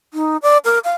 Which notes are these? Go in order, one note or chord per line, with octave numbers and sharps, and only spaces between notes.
D#4
D5
A#4
F5